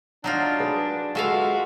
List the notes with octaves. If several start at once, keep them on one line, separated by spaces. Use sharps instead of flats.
F#3 D4 D#4 F4
G#4 B4
G#3 F4 F#4 A4 B4 E5 F5